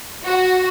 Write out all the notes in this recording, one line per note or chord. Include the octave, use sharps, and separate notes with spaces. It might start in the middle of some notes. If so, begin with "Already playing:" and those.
F#4